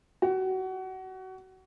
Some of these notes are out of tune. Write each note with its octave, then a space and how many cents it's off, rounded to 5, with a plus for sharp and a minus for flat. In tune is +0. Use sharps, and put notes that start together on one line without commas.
F#4 +25